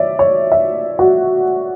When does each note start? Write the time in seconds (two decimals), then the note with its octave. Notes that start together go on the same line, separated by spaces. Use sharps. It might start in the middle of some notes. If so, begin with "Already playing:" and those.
Already playing: C#5 D5 E5
0.19 C#5
0.52 E5
0.99 F#4